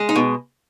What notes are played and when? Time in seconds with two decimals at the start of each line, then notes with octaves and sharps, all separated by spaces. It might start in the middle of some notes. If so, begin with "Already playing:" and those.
Already playing: G#3
0.09 D#4
0.16 B2